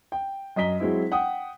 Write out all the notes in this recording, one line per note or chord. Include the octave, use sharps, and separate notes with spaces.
G5
F#2 D#5 A#5 B6 G7
F#3 G#3 C4 E4
F#5 G5 D#6